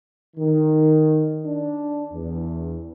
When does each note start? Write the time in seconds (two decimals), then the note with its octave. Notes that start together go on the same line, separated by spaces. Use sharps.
0.37 D#3
1.45 D4
2.12 E2